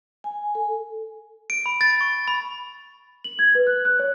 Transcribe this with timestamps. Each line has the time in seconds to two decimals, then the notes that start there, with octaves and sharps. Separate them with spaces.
0.24 G#5
0.55 A4
1.50 D7
1.66 B5
1.81 A6
2.01 C#6
2.28 B5
3.24 F#7
3.39 G#6
3.55 B4
3.67 F#6
3.85 F#6
3.99 C#5